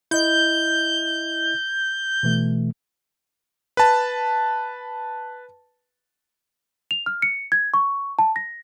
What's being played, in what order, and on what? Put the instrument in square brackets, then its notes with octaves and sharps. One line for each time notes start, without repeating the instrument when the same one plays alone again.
[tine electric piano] E4 D#5 [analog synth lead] G6
[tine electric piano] B2 E3 A3
[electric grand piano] B4 A5
[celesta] F7
F6
C#7
G#6
C#6
A5
A#6